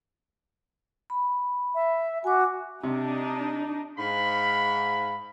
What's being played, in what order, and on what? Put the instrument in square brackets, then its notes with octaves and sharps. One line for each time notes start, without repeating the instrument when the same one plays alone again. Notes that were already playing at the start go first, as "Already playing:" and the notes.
[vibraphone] B5
[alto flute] E5
[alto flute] F#4 [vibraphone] G#5 D6
[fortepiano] C3 [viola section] D4 D#4
[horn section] G#2 F5 B5